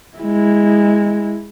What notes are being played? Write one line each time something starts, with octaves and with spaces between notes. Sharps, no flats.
G#3 E4